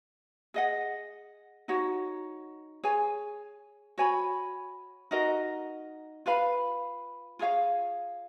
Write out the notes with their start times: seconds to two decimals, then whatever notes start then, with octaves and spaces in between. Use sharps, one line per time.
0.54 G#4 D#5 F#5
1.68 D#4 F#4 C#5 F#5
2.84 G#4 C#5 G#5
3.98 F#4 C#5 G#5 B5
5.11 D#4 F#4 A#4 D#5
6.26 F4 B4 F5 B5
7.39 F4 G#4 C#5 F5